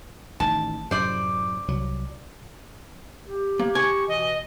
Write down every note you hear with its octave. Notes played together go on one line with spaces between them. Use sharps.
A1 D#3 A5
F#2 A2 C3 C5 D5
C2 F#3
G4
A#3
G#5 C#6
B2 E3 D#5